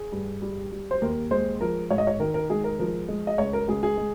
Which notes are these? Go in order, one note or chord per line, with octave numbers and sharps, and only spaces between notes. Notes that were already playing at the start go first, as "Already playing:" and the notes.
Already playing: G#4
G2
G3
G3
C5
D#2 A#4
G#3 C5
F3 A#4
G#2 C#5
D#5
C#5
D#3 A#4
A#4
G#3 G#4
A#4
F3 A#4
G#3
D#5
C#2 C#5
A#4
C#2 G#4
G#4
G#3